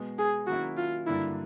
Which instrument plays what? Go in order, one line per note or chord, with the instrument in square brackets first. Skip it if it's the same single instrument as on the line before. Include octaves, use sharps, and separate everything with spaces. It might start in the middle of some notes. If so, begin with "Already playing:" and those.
Already playing: [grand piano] B2 G#3 B3
[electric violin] G#4
[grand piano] D#3 F#3 A#3 C#4 E4 [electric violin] F#4
[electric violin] F4
[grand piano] G2 D3 F#3 A#3 D4 [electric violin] E4